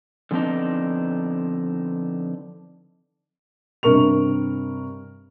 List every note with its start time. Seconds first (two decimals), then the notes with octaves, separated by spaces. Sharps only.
0.31 D3 F3 B3 C4 D4 D#4
3.83 G2 C3 A#4 C#6 F7